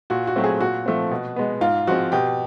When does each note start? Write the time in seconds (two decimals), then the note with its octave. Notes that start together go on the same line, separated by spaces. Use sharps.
0.10 A#2 F#4
0.27 F#4
0.36 F#3 A3 C4
0.44 G#4
0.61 A#2 F#4
0.86 F3 A3 C4
1.11 B2
1.36 G#3 B3
1.61 G#2 F4
1.87 F3 G#3 C4 F#4
2.12 B2 G4